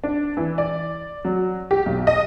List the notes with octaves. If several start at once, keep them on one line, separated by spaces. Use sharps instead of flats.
D4
E3
D5
F#3
G4
B1
D#5